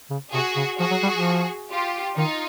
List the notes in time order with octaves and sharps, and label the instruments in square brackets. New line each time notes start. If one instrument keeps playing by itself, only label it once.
[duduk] C#3
[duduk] C3 [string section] F#4 G#4
[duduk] C#3
[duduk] F3 [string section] F#4 G#4
[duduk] F#3
G3
F3
[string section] F4 G4
[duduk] D#3 [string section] D#4 F4